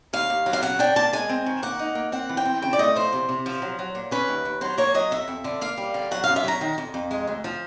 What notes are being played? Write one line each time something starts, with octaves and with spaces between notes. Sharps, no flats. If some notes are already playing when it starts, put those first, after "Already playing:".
D#2 F5
D#2
F#3
F5
C#3 F#5
D4 G5
A#3 A5
G#3 G#5
C4
D#3
A#3 F#5
D#4
A#3
C4 F#5
E3
G5
C4
C#3 G5
D5
A3 D#5
F3 C5
C3
C3
F3
F#3
F#3
A#2
C#4 B4
D#2
D#2
F#3 C5
A#3 C#5
F#3 D#5
F2 E5
F2
D3
A#3 F5
G3
D3
F#3 F#5
F#2 F5
E5
F#3 A#5
D#3
F2
F2
G#3
D2
F3